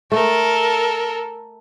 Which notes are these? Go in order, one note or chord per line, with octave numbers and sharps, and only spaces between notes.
A3 A4 A#4